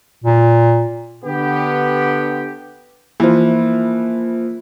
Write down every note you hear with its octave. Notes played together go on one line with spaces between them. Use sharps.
A#2
D3 B3 G4
E3 F3 A#3 F4 C5